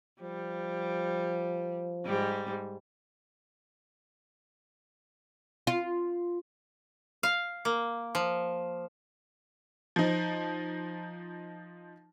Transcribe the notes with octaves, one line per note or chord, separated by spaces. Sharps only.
F3 G3
G#2 G3
F4
F5
A#3
F3
F3 D#4